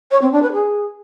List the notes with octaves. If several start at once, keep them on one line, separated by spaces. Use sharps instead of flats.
C#5
C4
D4
B4
G#4